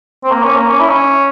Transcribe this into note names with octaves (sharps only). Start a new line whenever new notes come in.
C4
A#3
C#4
A#3
C#4
E4
C#4